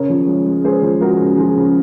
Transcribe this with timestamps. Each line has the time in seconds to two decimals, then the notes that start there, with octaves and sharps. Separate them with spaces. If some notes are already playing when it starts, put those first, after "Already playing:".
Already playing: C#3 A#4 C#5
0.10 F3
0.27 G#3
0.46 G#3
0.64 G#3 G#4 C5
0.83 F3
1.01 G#3 F#4 A#4
1.20 C#3
1.38 F3 F4 G#4
1.56 C#3